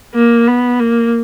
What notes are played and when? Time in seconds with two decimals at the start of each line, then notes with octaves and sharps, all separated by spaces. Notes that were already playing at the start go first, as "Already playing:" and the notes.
0.14 A#3
0.47 B3
0.80 A#3